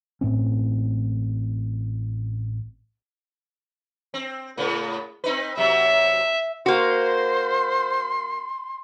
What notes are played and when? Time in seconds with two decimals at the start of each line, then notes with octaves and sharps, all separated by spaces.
0.21 A1 A2 C4 C#4
4.14 C4
4.57 A2 C#3 B3
5.24 C4 D#4 B4
5.57 C3 F#3 E5
6.66 A#3 F#4 C5 C6